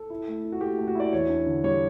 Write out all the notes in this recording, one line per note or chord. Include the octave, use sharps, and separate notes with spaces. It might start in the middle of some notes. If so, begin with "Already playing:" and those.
Already playing: A4
E4
A3
E4
F#4
A3 G4
A3
F#4
E4 D5
E2 C#5
D4
D3
G3 C#5